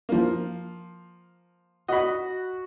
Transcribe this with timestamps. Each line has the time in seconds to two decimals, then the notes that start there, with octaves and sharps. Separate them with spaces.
0.09 F3 A#3
1.88 F#4 D#5 B5